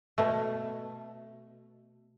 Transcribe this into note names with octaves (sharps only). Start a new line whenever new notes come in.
B2 A3